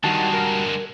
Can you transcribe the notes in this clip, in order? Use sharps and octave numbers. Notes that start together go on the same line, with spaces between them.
D3 D#3 G3 G#3 F#4 A5
A#4